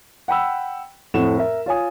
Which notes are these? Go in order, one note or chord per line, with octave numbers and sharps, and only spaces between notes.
F#5 G5 B5 E6
F2 A2 A3 C4 F#5 E7
A#4 E5
F4 C#5 G#5 D#6